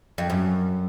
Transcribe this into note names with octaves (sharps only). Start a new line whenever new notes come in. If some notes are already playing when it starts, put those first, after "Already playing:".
F2
F#2